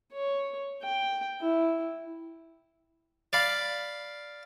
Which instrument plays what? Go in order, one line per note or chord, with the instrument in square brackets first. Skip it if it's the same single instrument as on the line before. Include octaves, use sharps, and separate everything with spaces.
[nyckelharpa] C#5
G5
E4
[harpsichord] D5 F5 B5